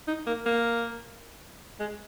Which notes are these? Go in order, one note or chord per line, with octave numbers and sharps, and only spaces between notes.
D#4
A#3
A#3
G#3